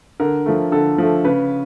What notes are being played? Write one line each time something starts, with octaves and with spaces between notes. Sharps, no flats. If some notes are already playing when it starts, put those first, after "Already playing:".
D3 A#4
F3 A3
D3 A4
F3 A3
C#3 B4